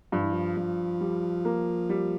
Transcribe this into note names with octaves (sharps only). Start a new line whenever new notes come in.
G2 F3
E3
F3
G2
G3
A#3
G3